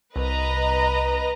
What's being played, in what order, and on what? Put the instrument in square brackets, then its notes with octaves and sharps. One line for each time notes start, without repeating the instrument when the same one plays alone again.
[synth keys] C2 [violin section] B4 D#5 A#5